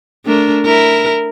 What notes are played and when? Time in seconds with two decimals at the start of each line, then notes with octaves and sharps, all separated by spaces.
0.25 A3 D4 A#4
0.65 E4 A#4